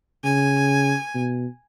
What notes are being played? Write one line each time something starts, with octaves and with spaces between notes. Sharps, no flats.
C#3 G#5
B2